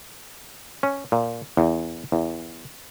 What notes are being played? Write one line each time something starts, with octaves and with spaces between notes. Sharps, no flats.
C#4
A#2
E2
E2